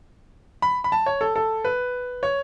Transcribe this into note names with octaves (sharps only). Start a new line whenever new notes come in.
B5
B5
A5
C#5
A4
A4
B4
C#5